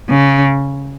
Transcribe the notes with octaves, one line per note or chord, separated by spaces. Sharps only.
C#3